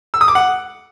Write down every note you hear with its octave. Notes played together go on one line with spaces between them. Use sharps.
E6
D#6
D6
F#5